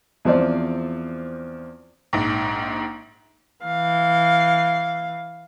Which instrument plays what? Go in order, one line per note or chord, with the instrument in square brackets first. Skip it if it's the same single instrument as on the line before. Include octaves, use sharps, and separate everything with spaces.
[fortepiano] E2 F3 C4 D5
[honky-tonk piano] A#1 G#2
[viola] E3 F5